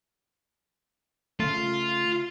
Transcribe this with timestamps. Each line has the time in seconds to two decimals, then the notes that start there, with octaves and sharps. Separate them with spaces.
1.40 C#3 A3 F4